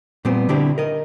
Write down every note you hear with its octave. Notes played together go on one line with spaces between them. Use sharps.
A#2 G3 B3 C4
D3 C4 D4 E4 G4
A#4 D#5